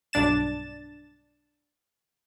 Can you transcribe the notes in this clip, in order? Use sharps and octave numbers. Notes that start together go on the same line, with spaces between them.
B1 G2 D4 A6 E7